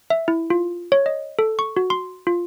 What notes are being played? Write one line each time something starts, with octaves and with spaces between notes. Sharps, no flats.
E5
E4
F4
C#5
D#5
A4
C#6
F#4
C6
F4